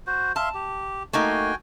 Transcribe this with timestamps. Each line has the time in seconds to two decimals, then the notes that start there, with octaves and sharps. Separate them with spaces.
0.07 F#4 C5
0.36 E5 F5 A5 C6
0.54 G4
1.13 A3 A#3 D#4 F#4 G5 G#5